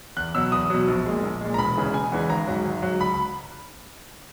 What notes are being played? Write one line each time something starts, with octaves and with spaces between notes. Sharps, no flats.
E2 F#6
B2 F#3 E6
E2 D#6
B2 F#3
A#1
A#2 G#3
A#1
A#2 G#3
A#5
E1 B5
E2 C#3 E3 G#3
E1 G#5
E2 C#3 E3 G#3
G#1 A#5
G#2 F#3
G#1
G#2 F#3
C#2 B5
B5